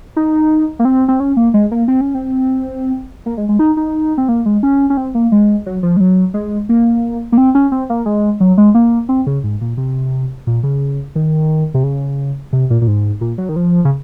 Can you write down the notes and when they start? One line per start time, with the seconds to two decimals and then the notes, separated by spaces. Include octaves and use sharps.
0.16 D#4
0.79 A#3
0.85 C4
1.08 C4
1.20 C#4
1.37 A#3
1.54 G#3
1.71 A#3
1.88 C4
2.01 C#4
2.14 C4
3.26 A#3
3.37 G#3
3.49 G#3
3.59 D#4
3.77 D#4
4.18 C4
4.29 A#3
4.46 G#3
4.63 C#4
4.90 C#4
4.97 C4
5.15 A#3
5.32 G#3
5.66 F#3
5.83 F3
5.97 G#3
6.00 F#3
6.34 G#3
6.69 A#3
7.32 A#3
7.38 C4
7.55 C#4
7.72 C4
7.90 A#3
8.06 G#3
8.40 F#3
8.58 G#3
8.75 A#3
9.09 C4
9.27 C#3
9.44 G#2
9.61 A#2
9.77 C3
10.47 A#2
10.63 C#3
11.15 D#3
11.74 C3
11.83 C#3
12.53 C3
12.70 A#2
12.82 A#2
12.88 G#2
13.21 A#2
13.38 F#3
13.49 D#3
13.56 F3
13.85 C#3